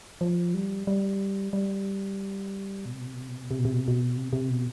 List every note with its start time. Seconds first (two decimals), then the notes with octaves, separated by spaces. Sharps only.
0.21 F3
0.54 G3
0.87 G3
1.53 G3
2.85 B2
2.92 C3
3.00 B2
3.06 C3
3.14 B2
3.21 C3
3.28 B2
3.36 C3
3.43 B2
3.51 C3
3.59 B2
3.65 C3
3.72 B2
3.80 C3
3.88 B2
4.17 C3
4.33 C3
4.50 B2